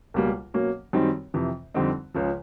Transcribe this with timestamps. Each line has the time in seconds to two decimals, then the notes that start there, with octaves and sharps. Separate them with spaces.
0.14 C#2 B2 G3 A#3
0.54 B2 F#3 A#3 C#4
0.93 F#2 D#3 G3 C4 D#4
1.34 F2 C3 E3
1.74 F2 D3 G3 C4 D#4
2.14 C#2 C#3 F3